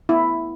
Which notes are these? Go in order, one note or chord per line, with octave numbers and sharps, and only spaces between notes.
B3 E4